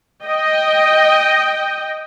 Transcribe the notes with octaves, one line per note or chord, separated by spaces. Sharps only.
D#5 G5